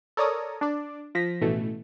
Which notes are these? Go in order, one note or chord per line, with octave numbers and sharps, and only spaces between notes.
A4 A#4 C#5 D5 A#5 D#6
D4 D5
F3 A#6 B6
A1 B2 E3 A3